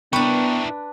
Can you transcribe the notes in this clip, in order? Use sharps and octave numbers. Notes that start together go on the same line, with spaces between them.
B3 D4 E4 A#4 B4 G5 C#6